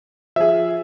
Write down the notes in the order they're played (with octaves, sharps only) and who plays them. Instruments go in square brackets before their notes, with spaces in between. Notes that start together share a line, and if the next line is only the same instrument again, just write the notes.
[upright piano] F3 G#4 [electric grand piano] E5